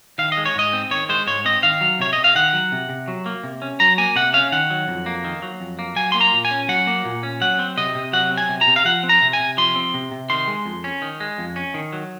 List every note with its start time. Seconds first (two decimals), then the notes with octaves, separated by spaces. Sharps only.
0.18 D#3 F5
0.32 D#5
0.37 G#3
0.45 C#5
0.55 G#2 D#5
0.73 C4
0.91 D#3 C#5
1.09 G#3 C5
1.27 G#2 C#5
1.45 C4 D#5
1.63 D#3 F5
1.81 F#3
1.99 C3 C#5
2.13 C3 D#5
2.24 F5
2.35 D#3 F#5
2.53 F#3
2.72 C3
2.89 C3
3.08 F#3
3.26 A#3
3.44 C3
3.62 C#4
3.80 F#3 A#5
3.98 A#3 G#5
4.16 C3 F#5
4.33 C#4 F5
4.52 D#3 F#5
4.70 F#3
4.88 F2
5.06 A#3
5.24 D#3
5.42 F#3
5.60 F2
5.79 A#3
5.96 F#3 G#5
6.12 A#3 C6
6.21 A#5
6.33 A#2
6.45 G#5
6.51 C#4
6.69 F#3 F#5
6.87 A#3
7.05 A#2
7.23 C#4
7.41 F#3 F#5
7.59 C4
7.77 C3 D#5
7.95 C3
8.13 F#3 F#5
8.31 C4
8.37 G#5
8.49 C3
8.61 A#5
8.67 C3
8.76 F5
8.85 F3 F#5
9.03 C4
9.09 A#5
9.22 C3
9.33 G#5
9.40 C3
9.57 F3 C6
9.76 C4
9.94 C3
10.11 C3
10.30 D#3 C6
10.48 G#3
10.66 F2
10.84 C#4
11.02 D#3
11.20 G#3
11.38 F2
11.56 C#4
11.74 D#3
11.93 F#3